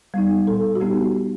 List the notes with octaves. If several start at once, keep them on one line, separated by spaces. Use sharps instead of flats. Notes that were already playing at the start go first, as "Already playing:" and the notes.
G3 B3 D#4
A#2 A4
F#4
G3 B3 D#4 G4